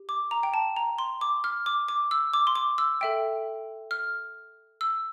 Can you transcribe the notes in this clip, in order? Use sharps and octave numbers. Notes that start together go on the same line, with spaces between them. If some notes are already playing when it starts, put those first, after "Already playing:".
Already playing: G4
D6
A#5
G5
A5
A#5
C6
D6
F6
D6
D6
E6
D6
C6
D6
E6
A4 E5 G5
F6
E6